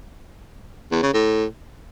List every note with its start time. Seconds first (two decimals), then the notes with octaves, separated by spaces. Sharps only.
0.91 E2
1.03 C#3
1.14 A2